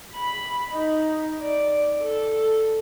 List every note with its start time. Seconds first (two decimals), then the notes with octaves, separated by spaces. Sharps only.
0.13 B5
0.71 D#4
1.42 D5
2.01 A4